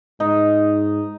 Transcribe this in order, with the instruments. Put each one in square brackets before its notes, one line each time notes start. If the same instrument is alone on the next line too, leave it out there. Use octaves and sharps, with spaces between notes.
[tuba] G#2 [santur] D#4